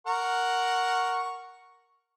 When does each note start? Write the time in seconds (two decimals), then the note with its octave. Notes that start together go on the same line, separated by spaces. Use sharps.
0.07 A#4 F#5 C#6